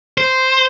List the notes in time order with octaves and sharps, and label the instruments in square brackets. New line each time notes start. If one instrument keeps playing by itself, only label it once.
[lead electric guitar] C5